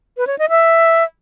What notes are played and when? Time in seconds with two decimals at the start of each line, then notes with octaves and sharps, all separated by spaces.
0.17 B4
0.27 C#5
0.38 D#5
0.49 E5